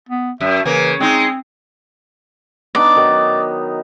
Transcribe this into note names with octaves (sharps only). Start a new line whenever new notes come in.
B3
F#2 E5
C#3 E3 A#3
G#3 C4 D#4
B3 D4 D#4 D5
D#3 F#3